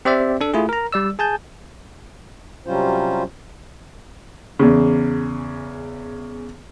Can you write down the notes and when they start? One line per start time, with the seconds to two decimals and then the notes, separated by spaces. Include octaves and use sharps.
0.05 C4 G4 C5 D5 E5
0.41 D4 A4
0.54 A3 E4 F4 G#4
0.69 A#4 A#5
0.93 G3 D5 E6
1.19 G#4 G#5 A5 G6
2.67 C3 F#3 G3 C#4 F4 C5
4.59 E2 C#3